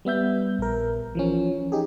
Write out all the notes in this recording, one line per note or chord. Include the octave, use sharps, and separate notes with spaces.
G3 B3 E5 G6
A#1 A#4
E3 F3 C#4
D#4 G4 G#4